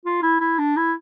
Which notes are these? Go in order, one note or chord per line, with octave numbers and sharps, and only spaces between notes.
F4
E4
E4
D4
E4